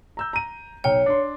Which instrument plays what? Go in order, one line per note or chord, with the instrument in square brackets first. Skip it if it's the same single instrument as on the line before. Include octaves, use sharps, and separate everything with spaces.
[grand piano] A#5 E6 G6
A#5 D#7
[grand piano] B1 G5 F6 [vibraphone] C#5
[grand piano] D4 C6